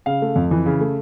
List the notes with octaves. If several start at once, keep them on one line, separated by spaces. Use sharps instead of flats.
C#3 F5
A3
F2
E3
C#3
A3